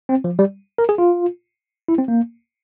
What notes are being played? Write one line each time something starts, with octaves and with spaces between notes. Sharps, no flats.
C4
F3
G3
A#4
G#4
F4
E4
C4
A#3